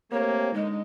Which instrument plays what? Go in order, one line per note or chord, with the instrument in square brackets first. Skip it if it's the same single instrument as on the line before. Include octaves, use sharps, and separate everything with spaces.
[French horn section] A3 C4 G4 [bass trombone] A#3 [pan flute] C#5
[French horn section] D3 D#4 [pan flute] G#3